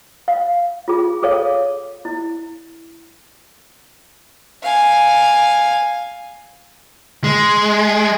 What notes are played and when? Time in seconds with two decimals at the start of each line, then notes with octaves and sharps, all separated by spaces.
0.28 F5
0.88 F4 G#4
1.23 G#4 A4 C#5 F5
2.05 E4
4.63 F5 G#5
7.24 G#3